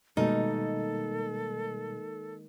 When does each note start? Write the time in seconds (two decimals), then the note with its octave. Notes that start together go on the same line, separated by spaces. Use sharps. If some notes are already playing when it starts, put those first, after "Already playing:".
0.17 B2 D#3 G3 G#3 A#3 D#4 A4